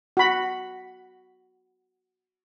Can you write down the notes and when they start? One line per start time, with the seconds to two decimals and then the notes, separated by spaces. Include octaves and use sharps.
0.17 F#4 B5